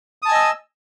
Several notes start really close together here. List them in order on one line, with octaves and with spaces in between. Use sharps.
D#6 A5 G#5 D#5 E6